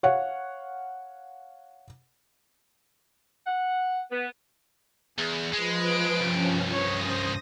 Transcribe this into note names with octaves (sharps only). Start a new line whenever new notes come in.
C#5 F5 F#5
F#5
B3
E2 G#4
F3 G#3 B4
D7
C2 G2 F3 C#4
C#5 D#6 A#6
C#4 C5